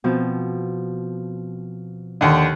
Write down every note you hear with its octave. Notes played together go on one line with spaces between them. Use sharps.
B2 F3 C4
D#2 D3